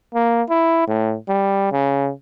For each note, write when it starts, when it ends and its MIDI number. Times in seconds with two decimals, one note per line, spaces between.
0.15 0.42 58
0.50 0.83 64
0.88 1.16 45
1.29 1.70 55
1.72 2.10 49